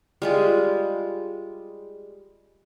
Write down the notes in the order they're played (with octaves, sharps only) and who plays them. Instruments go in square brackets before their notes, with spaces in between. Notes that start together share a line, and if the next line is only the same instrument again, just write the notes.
[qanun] G3 G#3 F4